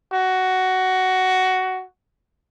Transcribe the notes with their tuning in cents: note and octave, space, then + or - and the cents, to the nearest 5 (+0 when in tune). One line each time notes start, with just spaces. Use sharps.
F#4 +10